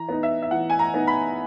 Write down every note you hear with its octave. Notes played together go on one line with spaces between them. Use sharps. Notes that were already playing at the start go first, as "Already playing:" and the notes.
Already playing: E3 A#5
B3 D#4
E5
E5
E3 F#5
G#5
A#5
B3 D#4
B5